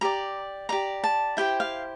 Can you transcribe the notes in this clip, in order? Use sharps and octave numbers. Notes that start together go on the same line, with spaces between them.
G4 D5 A#5
G4 D5 A#5
A5
E4 G4 C5 G5
F5